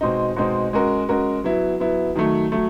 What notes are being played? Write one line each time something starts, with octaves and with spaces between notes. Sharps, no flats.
B2 G#3 C4 D#4
B2 G#3 C4 D#4
G#3 C#4 F#4 A#4
G#3 C#4 F#4 A#4
F#3 B3 E4
F#3 B3 E4
D#3 F#3 A3
F#3 A3